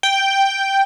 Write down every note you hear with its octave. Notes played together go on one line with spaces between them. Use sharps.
G5